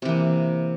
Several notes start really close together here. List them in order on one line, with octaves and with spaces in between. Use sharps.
C3 E3 A#3